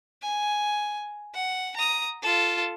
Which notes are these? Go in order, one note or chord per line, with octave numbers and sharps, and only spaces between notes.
G#5
F#5
A#5 D#6
F4 A4